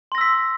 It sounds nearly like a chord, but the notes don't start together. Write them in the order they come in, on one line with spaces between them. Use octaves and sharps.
C6 A#6 E6 B6